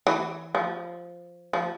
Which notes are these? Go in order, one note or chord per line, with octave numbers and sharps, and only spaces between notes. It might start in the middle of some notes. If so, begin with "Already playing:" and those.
E3
F3
F3